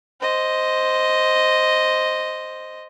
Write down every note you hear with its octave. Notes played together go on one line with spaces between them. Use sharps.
C5 D#5